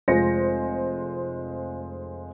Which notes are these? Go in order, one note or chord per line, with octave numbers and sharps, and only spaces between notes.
F1 G#3 F4 C5 A#6 C#7